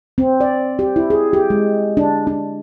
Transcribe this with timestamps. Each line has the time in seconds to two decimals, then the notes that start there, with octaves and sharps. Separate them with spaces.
0.18 C4
0.41 D5
0.79 G4
0.96 E4
1.10 G#4
1.33 G4
1.50 G#3
1.97 D4
2.27 D4